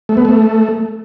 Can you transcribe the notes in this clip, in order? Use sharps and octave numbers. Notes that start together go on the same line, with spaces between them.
A3
B3
A3